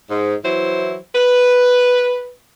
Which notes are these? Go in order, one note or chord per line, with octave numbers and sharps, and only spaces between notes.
G#2
E3 F#3 E4 C5
B4